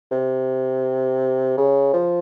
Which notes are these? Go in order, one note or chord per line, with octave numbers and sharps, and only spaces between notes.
C3
C#3
F3